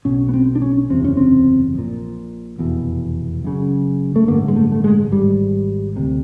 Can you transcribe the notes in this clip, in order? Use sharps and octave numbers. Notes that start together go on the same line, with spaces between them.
B1 B2 C#4
B3
C4
D4
C#4
F#1 E2 C3 C4
C#4
C4
A#1 A#2
F1 E2 B2
F#1 F#2 C#3
A3
A1 G2 D3 A#3
G#3
A3
A3
G#3
G#1 G#2 G3
D2 C3